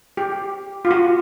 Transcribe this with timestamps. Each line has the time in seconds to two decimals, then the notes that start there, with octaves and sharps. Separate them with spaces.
0.17 G4
0.85 F4
0.91 F#4